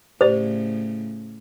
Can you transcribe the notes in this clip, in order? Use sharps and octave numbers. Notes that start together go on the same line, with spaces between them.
A2 C#3 G4 C5 D5